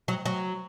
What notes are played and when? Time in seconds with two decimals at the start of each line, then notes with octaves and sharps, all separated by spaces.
0.08 F#3
0.26 F#3